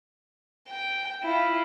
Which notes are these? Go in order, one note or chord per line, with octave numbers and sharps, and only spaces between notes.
G5
E4 F4